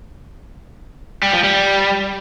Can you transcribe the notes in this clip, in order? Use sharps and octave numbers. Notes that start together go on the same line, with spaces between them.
G3
F3
G3